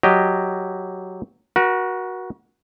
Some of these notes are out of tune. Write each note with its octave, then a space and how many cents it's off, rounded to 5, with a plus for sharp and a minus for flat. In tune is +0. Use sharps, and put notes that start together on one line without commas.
F#3 +0 G4 +0 D#5 +0
F#4 +0 A#4 +45